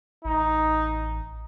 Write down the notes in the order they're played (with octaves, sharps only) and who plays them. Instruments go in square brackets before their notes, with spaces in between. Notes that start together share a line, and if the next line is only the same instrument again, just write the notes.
[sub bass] A1 [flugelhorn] D#4